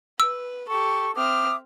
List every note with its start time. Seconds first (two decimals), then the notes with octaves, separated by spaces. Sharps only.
0.20 B4 E6
0.68 G4 A4 C#6
1.16 C4 E5 D6 D#6 F6